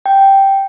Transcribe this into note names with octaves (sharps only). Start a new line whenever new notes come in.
G5